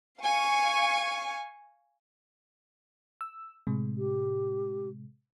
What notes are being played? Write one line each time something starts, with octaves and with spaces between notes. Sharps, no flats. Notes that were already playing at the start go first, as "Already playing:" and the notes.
F5 G#5 C#6
E6
A2 C3 G#3
G4